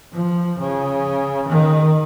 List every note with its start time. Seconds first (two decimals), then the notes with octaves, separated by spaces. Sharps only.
0.13 F3
0.59 C#3
1.48 D#3